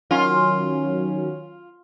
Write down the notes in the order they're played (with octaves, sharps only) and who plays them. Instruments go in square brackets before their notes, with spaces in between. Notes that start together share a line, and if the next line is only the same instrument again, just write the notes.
[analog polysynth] D#3 F#3 C#4 [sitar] F4